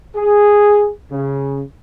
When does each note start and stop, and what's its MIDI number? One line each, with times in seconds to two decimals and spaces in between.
0.16 0.90 68
1.11 1.61 49